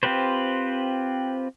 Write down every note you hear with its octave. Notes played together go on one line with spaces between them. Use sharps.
C4 F4 G4 B4 C5